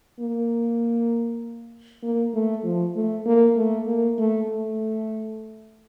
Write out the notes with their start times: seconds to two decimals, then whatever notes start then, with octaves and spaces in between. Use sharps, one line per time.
0.20 A#3
2.03 A#3
2.34 A3
2.64 F3
2.96 A3
3.26 A#3
3.57 A3
3.87 A#3
4.19 A3
4.50 A3